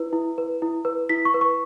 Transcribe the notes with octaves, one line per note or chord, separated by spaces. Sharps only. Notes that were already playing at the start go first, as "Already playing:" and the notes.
Already playing: E4 B4
E4
B4
E4
B4
E4 B6
C#6
B4
C#6